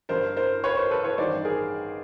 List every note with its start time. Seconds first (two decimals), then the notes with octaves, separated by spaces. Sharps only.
0.09 G1 G2 D3 A#4 C5
0.37 A#4 C5
0.64 B4 C#5
0.77 A#4 C5
0.91 A4 B4
1.04 B4 C#5
1.18 A1 G2 D#3 G3 C5 D5
1.45 G#4 A#4